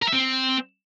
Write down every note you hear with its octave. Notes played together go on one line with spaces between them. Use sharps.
A#4
E5
C4